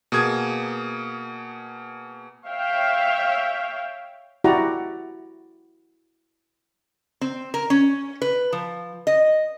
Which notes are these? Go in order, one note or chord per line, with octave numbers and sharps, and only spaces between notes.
B2 A#3 G#4 D#6 G#6
C#5 E5 F5 G5
E4 F#4 G4 D5 F#5 A#5
C4
A#4
C#4
B4
F3
D#5